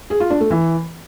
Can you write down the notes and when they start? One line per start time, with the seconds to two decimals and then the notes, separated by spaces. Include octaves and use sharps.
0.10 G#4
0.20 F4
0.30 D4
0.40 A3
0.50 E3